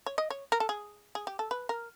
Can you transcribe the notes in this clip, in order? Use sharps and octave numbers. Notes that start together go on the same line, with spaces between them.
C#5
D#5
C#5
A#4
A4
G#4
G#4
G4
A4
B4
A#4